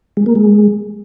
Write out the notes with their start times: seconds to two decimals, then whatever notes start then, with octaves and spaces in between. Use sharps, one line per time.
0.17 G#3
0.26 A#3
0.35 G#3